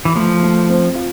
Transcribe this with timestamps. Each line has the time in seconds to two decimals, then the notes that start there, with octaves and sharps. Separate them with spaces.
0.05 E3
0.16 F3 A3
0.43 A3
0.69 C4
0.95 F4